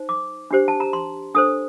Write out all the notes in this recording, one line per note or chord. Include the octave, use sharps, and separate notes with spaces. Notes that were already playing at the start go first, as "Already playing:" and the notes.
Already playing: D#4 C5
D6
D4 G4 C5
A5
A#5
C6
D4 A4 C5 D#6